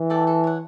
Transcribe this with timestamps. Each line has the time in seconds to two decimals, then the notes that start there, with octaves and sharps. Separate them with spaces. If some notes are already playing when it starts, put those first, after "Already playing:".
Already playing: E3
0.10 A4 D5 G5
0.27 A4
0.44 C#5 F#5